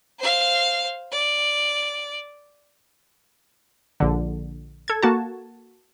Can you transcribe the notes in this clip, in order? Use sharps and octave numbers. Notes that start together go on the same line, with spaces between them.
C5 F5
D5
A#1 D3
A4 G#6
A#3 F#4 A5